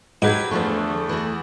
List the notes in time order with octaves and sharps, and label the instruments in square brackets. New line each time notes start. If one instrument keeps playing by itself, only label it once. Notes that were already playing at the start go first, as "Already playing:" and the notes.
[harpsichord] G#2 [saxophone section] F#3 G4 B4 [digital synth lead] G#6
[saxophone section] E2 [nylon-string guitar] D3 F3 C5 [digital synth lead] A3
[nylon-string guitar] E3 F#4